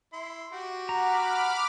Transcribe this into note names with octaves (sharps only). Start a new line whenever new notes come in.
E4 C6
F#4 G4
F#5 A#5 B5 D6 F6